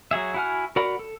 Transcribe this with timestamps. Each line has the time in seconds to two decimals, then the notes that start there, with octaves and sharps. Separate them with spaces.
0.11 F#3 F#4 G#4 E5
0.34 E4 F#4 F#5 G#5 F6
0.76 F#4 A#4 D5 F#5 B5
0.99 A4